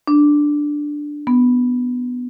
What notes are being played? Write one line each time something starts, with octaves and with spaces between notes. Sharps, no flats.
D4
B3